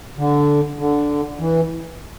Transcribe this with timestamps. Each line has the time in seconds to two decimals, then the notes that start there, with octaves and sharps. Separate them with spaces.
0.18 D3
0.79 D3
1.39 E3